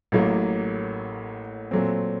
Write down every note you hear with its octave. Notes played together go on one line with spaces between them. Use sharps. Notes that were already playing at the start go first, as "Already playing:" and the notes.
A1 A2 F#3 A#3
A#2 F#3 A3 C4